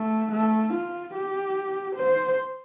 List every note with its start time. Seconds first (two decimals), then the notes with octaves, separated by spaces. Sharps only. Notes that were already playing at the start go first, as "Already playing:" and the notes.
Already playing: A3
0.32 A3
0.73 F4
1.14 G4
1.96 C5